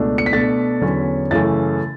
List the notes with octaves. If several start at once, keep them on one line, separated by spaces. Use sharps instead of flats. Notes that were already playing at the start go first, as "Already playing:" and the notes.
Already playing: C#2 B2 A3 D4
C#7
B6
B2 A3 D4 A6
E2 D3 F#3 C#4
F#2 C#3 E3 A3 A6